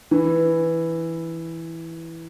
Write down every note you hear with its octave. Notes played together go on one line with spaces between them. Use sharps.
E3